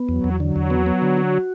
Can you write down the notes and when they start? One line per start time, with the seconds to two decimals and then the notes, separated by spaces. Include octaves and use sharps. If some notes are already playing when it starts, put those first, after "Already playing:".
Already playing: B3
0.09 E2 F#3
0.24 E2
0.40 D3 F#3
0.56 E2
0.70 B3
0.86 B3
1.02 D3
1.17 F#4